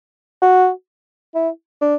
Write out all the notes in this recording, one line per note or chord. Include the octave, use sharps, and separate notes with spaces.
F#4
E4
D4